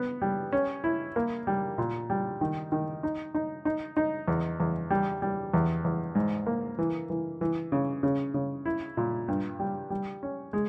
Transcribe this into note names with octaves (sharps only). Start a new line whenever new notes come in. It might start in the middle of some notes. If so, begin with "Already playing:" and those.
Already playing: B3
G3
C#4
E4
A#3
G3
A#2
G3
D#3
D#3
D#4
D#4
D#4
D#4
E2
E2
G3
G3
E2
E2
G#2
A#3
E3
E3
E3
C#3
C#3
C#3
E4
A#2
G2
G3
G3
C#4
G#3